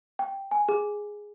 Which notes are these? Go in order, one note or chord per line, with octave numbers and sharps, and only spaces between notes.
G5
G#5
G#4